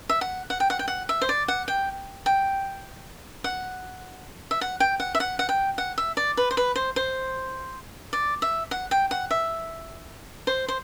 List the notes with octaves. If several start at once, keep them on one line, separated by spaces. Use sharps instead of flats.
E5
F#5
F#5
G5
F#5
G5
F#5
E5
C5
D5
F#5
G5
G5
F#5
E5
F#5
G5
F#5
E5
F#5
F#5
G5
F#5
E5
D5
B4
C5
B4
C5
C5
D5
E5
F#5
G5
F#5
E5
C5
C5